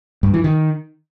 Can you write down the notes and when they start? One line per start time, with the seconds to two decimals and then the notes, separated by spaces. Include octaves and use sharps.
0.23 G2
0.34 E3
0.44 D#3